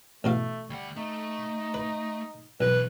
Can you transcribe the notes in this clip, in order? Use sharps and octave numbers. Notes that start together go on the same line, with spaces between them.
A1 B2 A3 F5
D2 G3 F#5
A3 D#4
B4
B1 B2 E3 B4